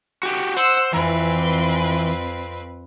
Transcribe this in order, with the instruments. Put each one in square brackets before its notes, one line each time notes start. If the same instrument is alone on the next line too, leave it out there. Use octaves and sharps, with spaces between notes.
[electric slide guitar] F#4 G4
[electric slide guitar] C5 [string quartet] F#5 E6 F#6
[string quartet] F2 C4 B4 [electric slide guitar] E3